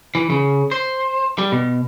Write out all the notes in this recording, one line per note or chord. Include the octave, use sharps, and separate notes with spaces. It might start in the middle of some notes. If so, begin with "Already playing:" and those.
E3
C#3
C5
G3
B2